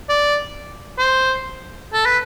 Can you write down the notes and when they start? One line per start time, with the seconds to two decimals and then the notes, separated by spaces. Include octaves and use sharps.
0.09 D5
0.99 C5
1.93 A4
2.05 B4